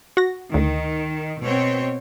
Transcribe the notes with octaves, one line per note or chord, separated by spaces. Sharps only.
F#4 A#6
D2 D#3
B2 C4 C#5